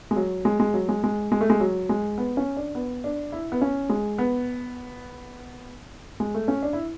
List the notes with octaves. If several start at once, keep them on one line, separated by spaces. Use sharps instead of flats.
G#3
F#3
G#3
G#3
F#3
G#3
G#3
G#3
A3
G#3
F#3
G#3
B3
C#4
D4
B3
D4
E4
B3
C#4
G#3
B3
G#3
A3
C#4
D4
E4